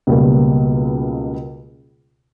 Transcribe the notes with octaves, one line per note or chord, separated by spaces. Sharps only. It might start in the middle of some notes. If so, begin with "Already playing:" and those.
C#2 B2 G3 A#3